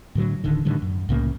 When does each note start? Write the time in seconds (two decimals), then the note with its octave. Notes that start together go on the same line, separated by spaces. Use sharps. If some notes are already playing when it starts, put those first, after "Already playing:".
0.15 A2 D3 F#3
0.44 D1 D3 D#3
0.65 A2 D3 D#3 G3
0.82 F#2
1.09 C2 A2 C#3 A#3